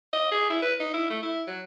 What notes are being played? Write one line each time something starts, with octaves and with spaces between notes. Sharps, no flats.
D#5
G#4
E4
B4
D#4
E4
A3
E4
F#3